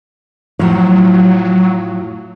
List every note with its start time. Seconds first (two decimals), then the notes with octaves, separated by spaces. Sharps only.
0.59 A2 F3 F#3